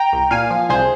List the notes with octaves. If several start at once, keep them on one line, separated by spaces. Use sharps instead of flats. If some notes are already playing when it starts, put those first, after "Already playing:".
Already playing: G5 A#5
C2
A#2 F5 G#5
F3
C2 G#4 C5